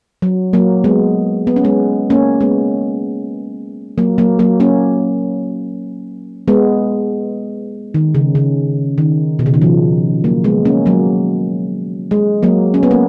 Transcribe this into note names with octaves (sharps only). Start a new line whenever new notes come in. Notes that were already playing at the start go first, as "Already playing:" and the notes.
F#3
F#3 A#3
G#3 B3
B3
C#4
G#3 B3
A#3 C#4
G#3 B3
F#3 A#3
F#3 A#3
F#3 A#3
A#3 C#4
G#3 B3
D#3
C#3
C#3
D#3
B2
C#3
D#3
F3
F#3 A#3
G#3 B3
A#3 C#4
F#3 A#3
G#3
F#3 A#3
C#4
B3
A#3